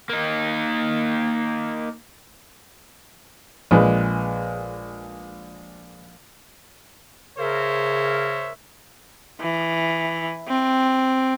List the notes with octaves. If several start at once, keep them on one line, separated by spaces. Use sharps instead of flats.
A#3 D#4
A#1 G#3 B4
C#3 G#4 A#4 C5 C#5 E5
E3
C4